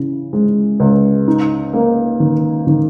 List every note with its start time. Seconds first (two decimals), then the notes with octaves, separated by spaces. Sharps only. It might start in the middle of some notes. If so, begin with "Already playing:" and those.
Already playing: C#3 E3
0.33 G#3
0.80 C#2
1.28 D#4
1.74 A#3
2.20 D#3
2.67 D#3